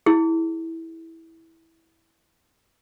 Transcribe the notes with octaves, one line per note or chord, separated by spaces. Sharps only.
E4 G#4